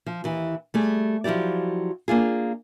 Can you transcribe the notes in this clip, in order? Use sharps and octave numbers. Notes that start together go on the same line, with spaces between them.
F3
D#2 E3
G3 A3 G#4
F3 F#3 E4 G4 D5
A#3 D4 F4 G#4